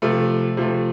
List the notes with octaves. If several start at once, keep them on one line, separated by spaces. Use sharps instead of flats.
C3 F3 A3
C3 F3 A3